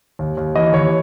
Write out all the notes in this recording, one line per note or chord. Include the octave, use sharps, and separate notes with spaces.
D#2
D#2
E3 D#5
D#2 C#5